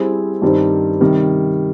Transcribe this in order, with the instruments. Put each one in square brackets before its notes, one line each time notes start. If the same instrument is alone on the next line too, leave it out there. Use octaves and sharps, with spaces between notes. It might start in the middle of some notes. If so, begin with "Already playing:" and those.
Already playing: [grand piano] G3 C4 E4 G#4
G2 D#3 G3 C4 D#4
C3 D#3 G3